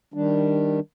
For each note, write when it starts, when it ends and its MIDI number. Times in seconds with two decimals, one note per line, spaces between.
0.14 0.80 51
0.14 0.80 55
0.14 0.80 62